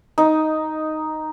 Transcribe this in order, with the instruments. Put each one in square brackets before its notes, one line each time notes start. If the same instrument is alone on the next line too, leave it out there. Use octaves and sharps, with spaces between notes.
[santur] D#4